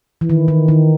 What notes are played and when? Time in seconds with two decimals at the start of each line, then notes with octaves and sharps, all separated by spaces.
0.21 E3
0.29 D#3
0.48 D#3
0.68 D#3